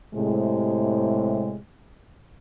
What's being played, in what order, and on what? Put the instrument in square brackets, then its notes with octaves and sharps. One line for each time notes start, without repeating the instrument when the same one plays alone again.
[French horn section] A2 C3 G#3